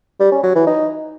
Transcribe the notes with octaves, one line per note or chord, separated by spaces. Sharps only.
G3
C#4
F#3
E3
D#4